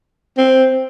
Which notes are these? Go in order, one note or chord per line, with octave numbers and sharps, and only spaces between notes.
C4